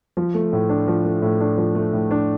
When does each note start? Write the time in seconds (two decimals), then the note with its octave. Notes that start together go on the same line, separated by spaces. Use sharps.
0.17 F3
0.34 A3
0.53 A2
0.69 D4
0.88 F3
1.05 A3
1.22 A2
1.41 D4
1.58 F3
1.75 A3
1.93 A2
2.11 D4